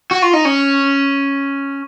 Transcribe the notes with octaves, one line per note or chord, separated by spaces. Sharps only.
F#4
F4
D#4
C#4